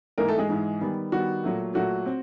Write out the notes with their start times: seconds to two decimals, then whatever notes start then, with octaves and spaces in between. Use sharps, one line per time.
0.18 G#2 E3 G#3 A#3 A#4
0.28 A3 A4
0.38 G#3 G#4
0.49 G#2 E3 G#3
0.81 D#3 G3 B3
1.12 D#3 G3 B3 F#4
1.43 A#2 F#3 A3
1.74 A#2 F#3 A3 F#4
2.06 C4